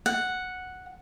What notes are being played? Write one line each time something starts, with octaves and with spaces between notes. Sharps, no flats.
F#5